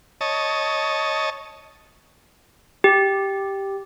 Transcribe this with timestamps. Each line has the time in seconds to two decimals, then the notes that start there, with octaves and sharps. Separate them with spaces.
0.21 C#5 D#5 A5
2.84 G4